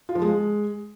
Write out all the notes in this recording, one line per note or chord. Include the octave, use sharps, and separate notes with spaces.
F4
F3
G#3